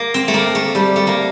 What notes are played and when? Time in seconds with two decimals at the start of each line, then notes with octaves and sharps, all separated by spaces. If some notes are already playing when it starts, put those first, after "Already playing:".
Already playing: A#3
0.14 C4
0.28 A3
0.34 A#3
0.55 A3
0.75 G3
0.96 A3
1.07 A#3